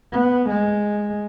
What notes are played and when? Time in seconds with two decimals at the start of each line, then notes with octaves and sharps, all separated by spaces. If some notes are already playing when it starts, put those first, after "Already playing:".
0.12 B3
0.50 G#3